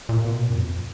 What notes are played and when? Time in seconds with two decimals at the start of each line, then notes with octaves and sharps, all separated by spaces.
0.09 A#2
0.24 B2
0.39 A#2
0.50 F#2
0.55 F2